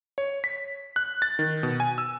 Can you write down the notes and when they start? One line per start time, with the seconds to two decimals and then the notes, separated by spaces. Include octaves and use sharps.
0.18 C#5
0.44 B6
0.96 F#6
1.22 A6
1.39 D#3
1.63 B2
1.80 G#5
1.98 E6